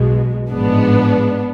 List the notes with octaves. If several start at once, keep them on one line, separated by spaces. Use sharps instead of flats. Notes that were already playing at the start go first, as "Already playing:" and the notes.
Already playing: B1 B2 G#3
A1 G#2 F3 G#3 B3 D4